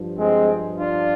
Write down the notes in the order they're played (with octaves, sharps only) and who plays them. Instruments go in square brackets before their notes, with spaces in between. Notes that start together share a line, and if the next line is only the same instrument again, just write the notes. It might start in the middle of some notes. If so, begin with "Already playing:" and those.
Already playing: [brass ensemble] G2 F3
G#3 C4
D4 F4